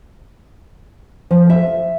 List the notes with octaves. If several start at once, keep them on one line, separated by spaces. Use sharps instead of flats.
F3
E5